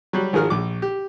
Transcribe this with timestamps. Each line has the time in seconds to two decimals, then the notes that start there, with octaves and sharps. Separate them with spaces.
0.13 F#3 G3
0.33 G#1 F3 G#4 A#4 F6
0.50 A#1 D6
0.82 G4